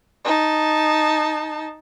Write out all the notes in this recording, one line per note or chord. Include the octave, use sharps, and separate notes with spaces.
D#4 A5